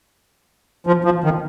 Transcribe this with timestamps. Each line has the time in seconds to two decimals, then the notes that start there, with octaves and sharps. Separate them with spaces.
0.87 F3
1.04 F3
1.24 D#3